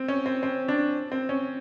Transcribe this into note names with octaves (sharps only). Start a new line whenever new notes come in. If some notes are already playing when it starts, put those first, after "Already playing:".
Already playing: C4
C#4
C4
C4
D4
C4
C#4